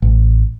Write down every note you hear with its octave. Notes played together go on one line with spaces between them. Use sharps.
A1